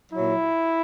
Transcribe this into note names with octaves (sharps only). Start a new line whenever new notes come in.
A#2 F#3 E4